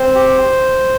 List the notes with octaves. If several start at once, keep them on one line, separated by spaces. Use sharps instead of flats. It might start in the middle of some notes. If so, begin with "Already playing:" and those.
Already playing: C4 C5
G4